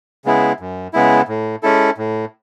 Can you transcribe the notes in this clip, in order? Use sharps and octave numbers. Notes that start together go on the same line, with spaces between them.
C#3 G#3 B3 E4
F#2
C#3 G#3 B3 E4
A2
G#3 C#4 E4 A4
A2